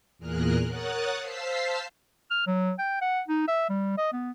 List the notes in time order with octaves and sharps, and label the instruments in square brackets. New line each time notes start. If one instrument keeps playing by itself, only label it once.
[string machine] E2 A#2 G#4 A#4 F6 F#6
A#4 C#5 F#5 D#6 F#6 A6
C5 F5 A5 E6 B6 C7
[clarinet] F6
F#3
G5
F#5
D#4
E5
G3
D#5
B3